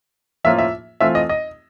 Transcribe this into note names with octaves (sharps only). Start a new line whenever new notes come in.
A2 F3 A#3 C#4 F4 E5
E5
E3 A3 C4 F4 E5
D#5
D#5